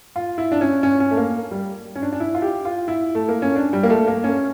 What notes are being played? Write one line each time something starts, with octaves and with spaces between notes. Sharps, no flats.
F4
E4
D4
C#4
C#4
C#4
A3
A#3
G3
C#4
D4
D4
E4
F4
G4
F4
E4
A3
A#3
C#4
D4
G3
A#3
A3
A#3
C#4